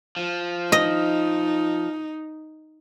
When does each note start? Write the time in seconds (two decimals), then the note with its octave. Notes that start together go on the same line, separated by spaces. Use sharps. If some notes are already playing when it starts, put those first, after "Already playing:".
0.17 F3
0.72 D#4 D#5